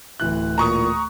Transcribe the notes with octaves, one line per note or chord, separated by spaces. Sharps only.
D1 E3 F#6
A#2 A#5 C#6 D#6